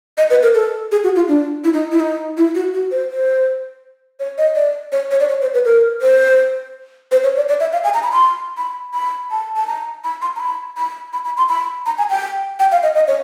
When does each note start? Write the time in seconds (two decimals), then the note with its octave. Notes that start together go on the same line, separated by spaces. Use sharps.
0.18 D#5
0.30 B4
0.43 A#4
0.55 A4
0.92 G#4
1.04 F#4
1.16 F4
1.28 D4
1.64 E4
1.73 D#4
1.91 E4
2.00 D#4
2.37 E4
2.55 F#4
2.73 F#4
2.91 C5
3.10 C5
4.20 C#5
4.38 D#5
4.55 D5
4.92 C#5
5.11 C#5
5.20 D5
5.29 C#5
5.42 C5
5.54 B4
5.65 A#4
6.02 C5
7.12 C5
7.24 C#5
7.36 D5
7.48 D5
7.60 E5
7.73 F5
7.84 G#5
7.94 A#5
8.03 B5
8.12 C6
8.58 B5
8.94 B5
9.31 A5
9.56 A5
9.67 A#5
10.04 B5
10.22 C6
10.36 A#5
10.40 B5
10.77 B5
11.13 B5
11.25 B5
11.38 C6
11.49 B5
11.86 A#5
11.98 G#5
12.10 G5
12.59 G5
12.72 F5
12.83 D#5
12.95 D#5
13.08 C#5